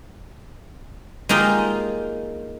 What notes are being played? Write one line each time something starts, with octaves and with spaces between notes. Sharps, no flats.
G#3 A#3 D#4 F4 G4